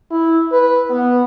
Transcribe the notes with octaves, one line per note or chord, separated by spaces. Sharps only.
E4
B4
B3